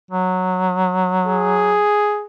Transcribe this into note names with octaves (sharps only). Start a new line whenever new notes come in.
F#3
G#4